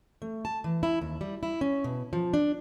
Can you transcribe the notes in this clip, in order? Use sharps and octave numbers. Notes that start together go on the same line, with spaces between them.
A3
A5
E3
E4
D#2
G3
E4
C#4
B2
F3
D4